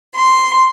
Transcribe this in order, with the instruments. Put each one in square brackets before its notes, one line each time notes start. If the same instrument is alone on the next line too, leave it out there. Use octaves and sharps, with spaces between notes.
[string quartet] C6